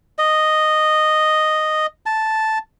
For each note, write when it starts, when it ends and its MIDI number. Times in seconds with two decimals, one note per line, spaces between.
0.18 1.86 75
2.06 2.58 81